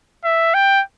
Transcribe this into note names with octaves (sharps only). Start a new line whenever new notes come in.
E5
G5